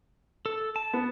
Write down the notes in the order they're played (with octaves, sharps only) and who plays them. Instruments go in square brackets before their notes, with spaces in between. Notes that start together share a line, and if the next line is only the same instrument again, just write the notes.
[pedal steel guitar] A4
A5
[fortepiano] B3